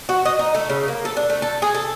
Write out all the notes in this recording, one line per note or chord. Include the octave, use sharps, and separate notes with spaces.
F#4
D#5
D#4
A3
C#3
A#3
A4
D4
A3
A4
G#4
A4